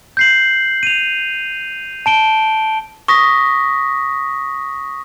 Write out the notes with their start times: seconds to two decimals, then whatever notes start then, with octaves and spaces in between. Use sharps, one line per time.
0.17 G6 C7 F#7
0.83 D#7 F7
2.06 A5 D7 G7
3.08 C#6 D#6 A#6 B6